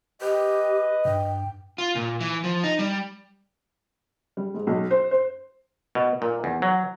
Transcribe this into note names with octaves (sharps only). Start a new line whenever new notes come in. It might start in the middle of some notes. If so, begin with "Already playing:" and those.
G4 B4 D#5
G2 G5
F4
A#2
E3
F3
D#4
G3
G3
G#2
B1
C5
C5
B2
A#2
E2
F#3